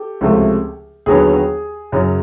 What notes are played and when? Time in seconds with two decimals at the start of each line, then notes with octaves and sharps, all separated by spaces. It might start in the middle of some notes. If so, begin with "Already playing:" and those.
Already playing: G4 A4
0.21 C#2 C3 F3 A3
1.06 D#2 D3 F#3 B3 G#4
1.92 F#2 C#3 F#3